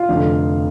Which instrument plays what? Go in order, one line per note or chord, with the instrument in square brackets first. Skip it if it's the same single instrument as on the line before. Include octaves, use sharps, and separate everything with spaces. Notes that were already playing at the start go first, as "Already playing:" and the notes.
Already playing: [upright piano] F4 F5
F1 F2 D3